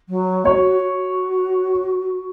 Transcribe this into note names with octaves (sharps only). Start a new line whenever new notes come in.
F#3
F#4 C#5
F#4